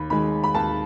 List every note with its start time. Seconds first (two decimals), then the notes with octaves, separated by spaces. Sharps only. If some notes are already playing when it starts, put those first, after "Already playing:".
Already playing: D#2 B5
0.10 D#3 G#3 B5
0.44 B5
0.55 D#2 A5